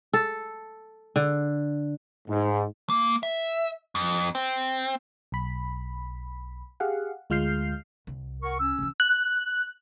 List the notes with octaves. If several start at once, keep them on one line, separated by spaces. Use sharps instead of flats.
A4
D3
G#2
A#3
E5
F2
C4
B1 B5
G4 G#4 F5 F#5
D2 G#3 F4 F6 G6 C7
C2
A#4 F#5 C#6
C#4 E6
C3 E3
F#6